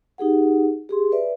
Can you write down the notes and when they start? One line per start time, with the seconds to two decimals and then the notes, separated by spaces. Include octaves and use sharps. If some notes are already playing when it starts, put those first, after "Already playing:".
0.18 D#4 G4 G#4 F#5
0.89 G4 G#4 C6
1.12 B4 D5 E5